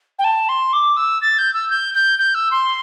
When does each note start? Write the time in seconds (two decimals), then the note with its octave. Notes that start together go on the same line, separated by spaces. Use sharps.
0.19 G5
0.24 A5
0.49 C6
0.73 D6
0.97 E6
1.22 A6
1.38 G6
1.54 E6
1.70 G6
1.94 G6
2.19 G6
2.34 E6
2.51 C6